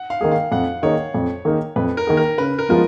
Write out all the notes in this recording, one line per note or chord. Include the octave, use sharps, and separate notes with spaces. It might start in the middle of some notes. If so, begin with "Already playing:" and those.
Already playing: F#5
F5
D#3 A#3 D#4 G#4
F5
F2 F#5
D#3 A#3 D#4 G#4 C#5
F2
D#3 A#3 D#4 G#4
F2 B4
A#4
D#3 A#3 D#4 G#4
A#4
C#3 B4
A#4
F3 G#3 B3 F4 A#4